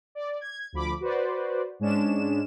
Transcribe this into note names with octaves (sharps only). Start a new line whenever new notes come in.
D5
G#6
D2 F3 B5 D6
F#4 B4 C5 D5
G#2 G#3 C#4 D4 E7